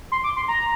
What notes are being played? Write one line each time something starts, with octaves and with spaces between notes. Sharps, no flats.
C6
D6
C6
A#5